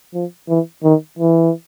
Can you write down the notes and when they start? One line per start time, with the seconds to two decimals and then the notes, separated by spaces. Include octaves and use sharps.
0.14 F3
0.49 E3
0.84 D#3
1.19 E3